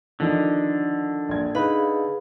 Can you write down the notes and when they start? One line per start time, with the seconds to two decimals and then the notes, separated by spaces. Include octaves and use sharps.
0.20 D3 D#3 F3 D#4
1.29 A#1 G#6
1.55 D#4 G#4 B4 F5 B5